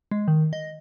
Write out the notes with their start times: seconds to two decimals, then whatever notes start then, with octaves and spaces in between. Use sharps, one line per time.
0.11 G#3
0.28 D#3
0.53 D#5